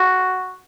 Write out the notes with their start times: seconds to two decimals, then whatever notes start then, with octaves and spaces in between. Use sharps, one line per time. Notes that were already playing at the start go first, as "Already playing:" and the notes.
Already playing: F#4